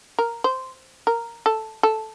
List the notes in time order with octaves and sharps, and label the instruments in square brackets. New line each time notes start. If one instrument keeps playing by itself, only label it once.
[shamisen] A#4
C5
A#4
A4
A4